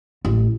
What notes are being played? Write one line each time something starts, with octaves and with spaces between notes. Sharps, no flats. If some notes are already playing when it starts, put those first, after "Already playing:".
A1